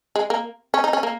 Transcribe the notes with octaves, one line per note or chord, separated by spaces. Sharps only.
G#3
A#3
C#4
D#4
C#4
A#3